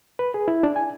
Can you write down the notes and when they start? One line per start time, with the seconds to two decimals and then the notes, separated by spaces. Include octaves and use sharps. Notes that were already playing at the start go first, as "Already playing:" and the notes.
0.19 B4
0.34 G#4
0.48 E4
0.63 D4
0.76 G#5